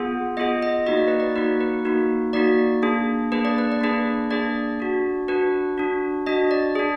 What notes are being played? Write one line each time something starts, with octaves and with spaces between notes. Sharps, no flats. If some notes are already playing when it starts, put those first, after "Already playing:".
Already playing: B3 F4 G#4 F#5
B3 F4 G#4 D#5
D#5
A#3 D#4 F#4 D#5
D5
B4
D5
A#3 D#4 F#4 B4
B4
A#3 D#4 F#4
A#3 D#4 F#4 D5
A#3 D4 G#4
A#3 D4 G#4 B4
D5
B4
D5
A#3 D4 G#4 B4
A#3 D4 G#4 D5
D4 F#4
D4 F#4 B4
D4 F#4
D4 F#4 D#5
D5
D4 G#4